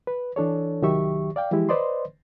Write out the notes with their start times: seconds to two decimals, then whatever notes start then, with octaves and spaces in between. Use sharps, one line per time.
0.07 B4
0.36 E3 D4 A4 C#5
0.82 C2 D#3 F#3 G4 E5 C#6
1.36 D5 F5 G5
1.51 E3 F3 G#3 E4 G4
1.69 B4 C5 D5 D#5 C6